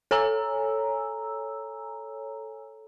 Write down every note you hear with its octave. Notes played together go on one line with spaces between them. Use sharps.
A4 C#5 G#5 A#5 E6